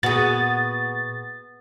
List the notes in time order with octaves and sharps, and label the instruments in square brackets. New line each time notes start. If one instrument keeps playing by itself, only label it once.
[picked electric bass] A#2 [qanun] B3 [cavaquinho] F#4 G#4 [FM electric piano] A6